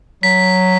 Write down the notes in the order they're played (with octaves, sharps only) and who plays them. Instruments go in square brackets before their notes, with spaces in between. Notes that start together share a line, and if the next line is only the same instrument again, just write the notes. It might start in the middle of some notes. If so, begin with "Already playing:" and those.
[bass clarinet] F#3 [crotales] B6